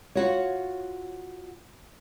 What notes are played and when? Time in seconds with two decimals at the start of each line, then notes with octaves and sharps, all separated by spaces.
0.15 F4 F#4 C#5